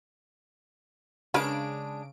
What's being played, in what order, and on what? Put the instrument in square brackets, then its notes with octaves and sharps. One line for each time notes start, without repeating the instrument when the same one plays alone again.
[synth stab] C#3 D7 [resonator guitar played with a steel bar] G#3 D4 [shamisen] A#4 B4 B5